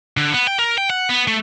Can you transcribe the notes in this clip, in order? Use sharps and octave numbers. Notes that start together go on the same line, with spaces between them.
D3
B3
G5
A#4
G5
F#5
B3
A3